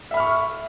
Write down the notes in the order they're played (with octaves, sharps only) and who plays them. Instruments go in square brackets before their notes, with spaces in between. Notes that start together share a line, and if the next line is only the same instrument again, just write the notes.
[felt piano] E5
B5
F6
C#6